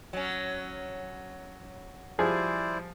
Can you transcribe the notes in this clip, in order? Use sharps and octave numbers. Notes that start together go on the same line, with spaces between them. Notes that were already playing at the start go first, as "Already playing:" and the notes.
F#3 C#4
F3 G3 E4 G#4 C5 D5